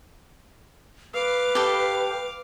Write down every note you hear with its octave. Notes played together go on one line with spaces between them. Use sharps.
B4 F5 D6
G4 A4